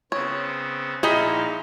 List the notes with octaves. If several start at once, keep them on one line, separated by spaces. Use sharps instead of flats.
C#3 B3 C4 C#5
A#2 F3 D#4 E4 G#4 F5 G5